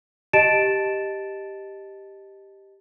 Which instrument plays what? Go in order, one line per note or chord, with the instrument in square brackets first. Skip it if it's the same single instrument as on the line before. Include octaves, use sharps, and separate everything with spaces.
[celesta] G4 D#5 A5 A6 D7 E7